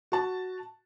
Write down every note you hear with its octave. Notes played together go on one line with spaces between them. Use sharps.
F#4 A5